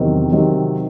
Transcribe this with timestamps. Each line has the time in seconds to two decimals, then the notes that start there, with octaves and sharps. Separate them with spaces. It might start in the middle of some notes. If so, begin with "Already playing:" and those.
Already playing: E2 C3 D#3 F#3 C4
0.32 C3 D#3 F#3 C4